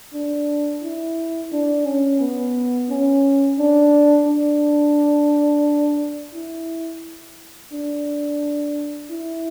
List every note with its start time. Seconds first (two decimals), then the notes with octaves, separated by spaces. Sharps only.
0.14 D4
0.83 E4
1.53 D4
1.86 C#4
2.21 B3
2.90 C#4
3.59 D4
4.28 D4
6.34 E4
7.73 D4
9.10 E4